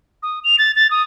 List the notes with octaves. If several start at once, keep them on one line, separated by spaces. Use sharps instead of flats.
D#6
F7
A6
A6
D#6